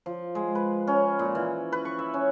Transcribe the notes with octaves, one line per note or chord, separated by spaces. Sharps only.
F3
G#3
B4
C#4
A#2
E3
B4
C#6
E5
C#4